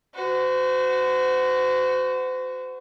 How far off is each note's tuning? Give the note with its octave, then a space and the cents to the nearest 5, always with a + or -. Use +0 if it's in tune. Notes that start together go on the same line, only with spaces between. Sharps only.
F#4 +0 C5 -40